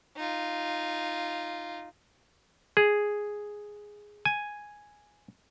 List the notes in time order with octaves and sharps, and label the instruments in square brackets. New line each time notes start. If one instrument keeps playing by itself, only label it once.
[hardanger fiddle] D#4 F4
[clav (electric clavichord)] G#4
G#5